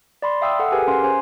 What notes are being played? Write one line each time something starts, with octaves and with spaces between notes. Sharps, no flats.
D5 B5 C6
E5 F5 G5 D#6 E6
A4 F#5
G4 G#4 A#4 B4 G#5
C#4 F5 C6
C#4 C5 G#5 C6